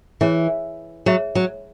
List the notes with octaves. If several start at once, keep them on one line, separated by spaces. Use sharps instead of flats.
E3 G#4 C#5 E5
F#3 G#4 C#5 E5
F#3